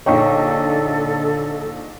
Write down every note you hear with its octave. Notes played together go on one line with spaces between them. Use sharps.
A#1 D3 D#4 A4 C#5 G5 C#6